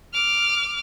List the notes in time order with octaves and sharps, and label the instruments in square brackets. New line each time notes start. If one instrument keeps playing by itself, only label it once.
[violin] D6 F6